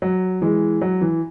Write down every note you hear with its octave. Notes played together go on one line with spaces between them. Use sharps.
F#3
E3 G#3
F#3
E3